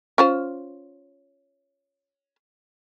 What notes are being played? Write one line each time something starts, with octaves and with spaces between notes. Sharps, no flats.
C#4 F4 C5